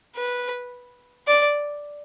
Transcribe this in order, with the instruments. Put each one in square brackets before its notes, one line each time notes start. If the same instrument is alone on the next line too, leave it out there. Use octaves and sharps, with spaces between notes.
[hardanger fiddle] B4
D5